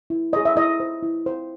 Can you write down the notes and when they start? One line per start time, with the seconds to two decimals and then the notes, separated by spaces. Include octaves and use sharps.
0.10 E4
0.33 G#4 C#5 D#5
0.45 E5
0.56 E4 D#5
0.80 C5
1.03 E4
1.26 C5